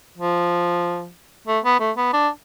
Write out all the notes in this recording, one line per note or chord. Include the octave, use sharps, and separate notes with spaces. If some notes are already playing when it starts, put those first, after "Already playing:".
F3
A3
B3
A3
B3
D4